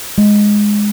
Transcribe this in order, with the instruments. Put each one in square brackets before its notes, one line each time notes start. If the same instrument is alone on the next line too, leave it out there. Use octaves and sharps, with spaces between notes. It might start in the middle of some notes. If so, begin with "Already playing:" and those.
[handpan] G#3